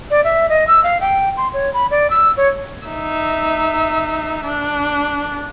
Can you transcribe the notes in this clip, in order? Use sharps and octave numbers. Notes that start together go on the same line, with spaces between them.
D5
E5
D#5
E6
F5
G5
C6
C#5
B5
D5
E6
C#5
D#4 E5
D4